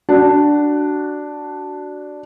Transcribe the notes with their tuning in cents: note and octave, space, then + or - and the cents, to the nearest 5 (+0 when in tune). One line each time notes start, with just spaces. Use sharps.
D4 +0 F#4 +15